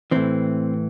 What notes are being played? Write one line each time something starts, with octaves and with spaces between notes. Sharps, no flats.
A2 E3 C4